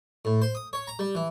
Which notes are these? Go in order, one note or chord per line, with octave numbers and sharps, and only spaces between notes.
A2
C5
D#6
C#5
A#5
G3
E3